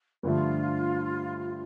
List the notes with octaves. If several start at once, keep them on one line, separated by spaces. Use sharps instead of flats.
G2 D3 F3 A3 F4